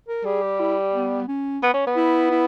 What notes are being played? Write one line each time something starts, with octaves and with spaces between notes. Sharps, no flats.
A#4
G3 G#4
G4
E4
B3
C#4
B3
C#4
B3
E4
E4